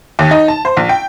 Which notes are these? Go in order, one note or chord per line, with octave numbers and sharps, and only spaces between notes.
D#2
D#4
A5
C5
A#1
G5